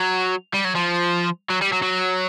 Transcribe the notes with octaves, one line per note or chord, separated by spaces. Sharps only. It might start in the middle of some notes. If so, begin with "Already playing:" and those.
Already playing: F#3
G3
F#3
F3
F#3
G3
F#3
F#3